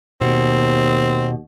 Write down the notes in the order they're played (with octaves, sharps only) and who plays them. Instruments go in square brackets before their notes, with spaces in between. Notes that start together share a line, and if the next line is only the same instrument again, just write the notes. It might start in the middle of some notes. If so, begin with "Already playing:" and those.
[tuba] D#2 [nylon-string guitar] B2 [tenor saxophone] C4